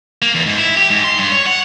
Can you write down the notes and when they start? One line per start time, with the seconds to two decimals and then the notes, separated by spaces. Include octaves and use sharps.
0.22 A#3
0.35 E2
0.46 G#2
0.58 E4
0.77 G4
0.90 G#2
1.04 C6
1.18 G2
1.32 C#5
1.46 F#5